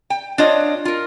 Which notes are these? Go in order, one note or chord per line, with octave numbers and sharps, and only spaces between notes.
G5
D4 F4 C#5 D#5
F4 A#4